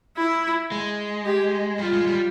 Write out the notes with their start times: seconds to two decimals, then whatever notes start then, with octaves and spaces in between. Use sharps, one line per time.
0.17 E4
0.72 G#3
1.26 G4
1.79 G3 F4
1.93 G#3
2.07 G3